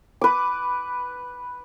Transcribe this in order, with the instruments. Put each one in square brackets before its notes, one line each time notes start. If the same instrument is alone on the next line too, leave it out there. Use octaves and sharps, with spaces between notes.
[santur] B4 D6